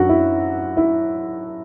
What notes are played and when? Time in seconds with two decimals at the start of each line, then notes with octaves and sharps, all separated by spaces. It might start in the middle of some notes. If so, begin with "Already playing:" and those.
Already playing: F#2 D4 F#4
0.09 E4
0.77 E4